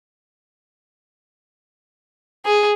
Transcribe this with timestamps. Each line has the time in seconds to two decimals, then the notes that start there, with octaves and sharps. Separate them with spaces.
2.46 G#4